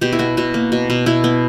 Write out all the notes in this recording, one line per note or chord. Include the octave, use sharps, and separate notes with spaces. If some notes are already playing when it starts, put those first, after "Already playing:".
B2 G4
E4
B2 F#4
B2 F#4
A#3
B2
B2
B2 E4
B3